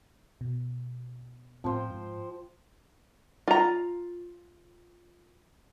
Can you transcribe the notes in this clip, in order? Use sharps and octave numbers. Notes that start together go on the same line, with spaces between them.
B2
A2 F3 C4 C5 G5
G#2
F4 A#5